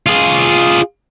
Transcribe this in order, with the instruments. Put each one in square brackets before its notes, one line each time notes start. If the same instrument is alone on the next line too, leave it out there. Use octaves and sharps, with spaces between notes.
[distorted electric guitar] F4 G#4